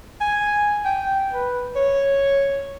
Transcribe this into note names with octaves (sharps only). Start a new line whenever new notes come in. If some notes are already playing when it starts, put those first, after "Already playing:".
G#5
G5
B4
C#5